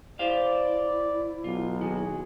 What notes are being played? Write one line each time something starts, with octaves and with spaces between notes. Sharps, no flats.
E4 G4 C5 D5 F5
B1 F4
D#2 F#4 G#4